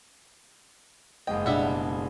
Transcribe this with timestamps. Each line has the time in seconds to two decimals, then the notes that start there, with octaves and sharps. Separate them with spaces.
1.27 F#1 G#2 D#5 G5
1.46 B2 G3 D4 E5 F#5